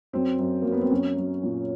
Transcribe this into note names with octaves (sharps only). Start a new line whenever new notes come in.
F#2 C4
F#2
F#2 A#3
B3
C4
F#3 C#4
F#3
A#2